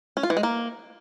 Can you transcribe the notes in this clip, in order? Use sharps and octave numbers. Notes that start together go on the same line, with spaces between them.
C#4
F4
E3
G#3
A#3